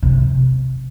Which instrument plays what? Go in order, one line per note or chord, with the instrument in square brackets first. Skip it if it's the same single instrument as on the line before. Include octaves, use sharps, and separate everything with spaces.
[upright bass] C3